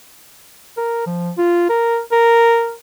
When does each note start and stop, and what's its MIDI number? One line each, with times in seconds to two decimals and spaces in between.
0.77 1.05 70
1.06 1.30 53
1.38 1.65 65
1.69 2.00 70
2.12 2.74 70